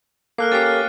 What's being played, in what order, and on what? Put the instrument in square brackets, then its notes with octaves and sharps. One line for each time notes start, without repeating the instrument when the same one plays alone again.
[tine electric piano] A#3 A4 [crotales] F6 F#6 C7
[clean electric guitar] C#4 G4 [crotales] A6 C7
[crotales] F6